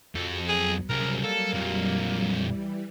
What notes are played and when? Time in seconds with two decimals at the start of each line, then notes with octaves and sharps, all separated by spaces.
0.15 F2 F#4 G#4 A4 G#5
0.49 F#3 B3 G#4
0.90 C2 C#3 F#3 G3 A#4
1.24 A#3 A4
1.54 F2 A#2
2.26 E3 G3